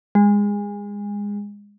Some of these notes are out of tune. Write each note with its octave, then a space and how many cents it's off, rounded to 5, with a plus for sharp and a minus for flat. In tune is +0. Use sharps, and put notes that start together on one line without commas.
G#3 -25